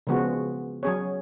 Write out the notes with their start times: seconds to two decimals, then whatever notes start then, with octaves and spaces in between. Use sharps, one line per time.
0.07 C#3 F3 G#3 B3 F#4
0.83 F#3 C#4 G#4 C#5